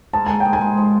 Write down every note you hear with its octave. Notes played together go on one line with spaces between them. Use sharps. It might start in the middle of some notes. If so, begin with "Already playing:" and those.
G#2 A5
G#2 G#5
G5
G#2
G#5
G#3
F3